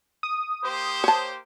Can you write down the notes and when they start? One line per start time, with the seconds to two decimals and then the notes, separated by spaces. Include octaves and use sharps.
0.23 D#6
0.64 A#3 G4 C5
1.04 C#5 A5